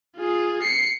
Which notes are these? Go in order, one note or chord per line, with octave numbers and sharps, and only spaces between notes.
F4 G#4
C7 C#7